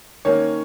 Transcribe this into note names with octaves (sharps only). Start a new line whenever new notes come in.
D#3 A#3 C#4 C#5